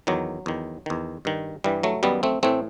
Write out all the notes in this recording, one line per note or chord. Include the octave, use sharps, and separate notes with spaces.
E2 D#3 F#3
E2 D#3
E2 D#3
G2 D#3
G2 E3 G3
F#3 A3
F#2 D#3 G3 B3
A3 C4
A2 E3 A3 C4